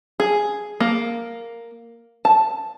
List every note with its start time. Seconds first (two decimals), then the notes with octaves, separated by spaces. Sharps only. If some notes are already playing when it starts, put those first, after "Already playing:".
0.20 G#4
0.80 A#3
2.25 A5